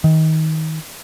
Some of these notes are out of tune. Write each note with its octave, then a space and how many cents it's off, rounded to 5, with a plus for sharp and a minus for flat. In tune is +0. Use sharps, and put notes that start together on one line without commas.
D#3 +25